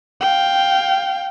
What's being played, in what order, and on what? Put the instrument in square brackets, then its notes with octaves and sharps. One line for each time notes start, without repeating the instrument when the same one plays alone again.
[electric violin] F5 G5